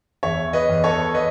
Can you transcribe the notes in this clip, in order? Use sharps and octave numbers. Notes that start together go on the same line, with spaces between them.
E2 C#5 E5
B4 D#5
E2
A4 C#5
B4 D#5